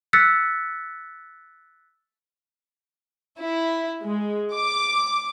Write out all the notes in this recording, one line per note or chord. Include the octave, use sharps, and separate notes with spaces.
E6 F#6 A6 B6 C#7
E4
G#3
D6